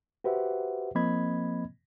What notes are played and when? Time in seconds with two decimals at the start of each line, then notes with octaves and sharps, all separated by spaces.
0.24 F#4 G4 B4 C5 E5 F#5
0.95 F3 A#3 C4 D#5 B5 G#6